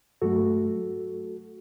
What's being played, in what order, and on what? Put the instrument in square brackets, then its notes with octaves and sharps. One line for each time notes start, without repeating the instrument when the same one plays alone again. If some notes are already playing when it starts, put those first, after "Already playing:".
[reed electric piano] G2 F#3 A3 F#4 A4